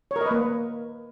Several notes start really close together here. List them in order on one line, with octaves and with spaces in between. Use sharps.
C#5 A#4 D#5 B4 A#3